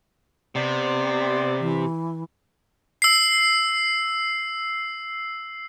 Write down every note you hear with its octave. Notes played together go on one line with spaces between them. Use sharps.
C3 B3 C5 D5
E3
E6 C7